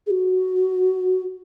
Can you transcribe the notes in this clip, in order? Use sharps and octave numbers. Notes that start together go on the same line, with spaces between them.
G#4
F#4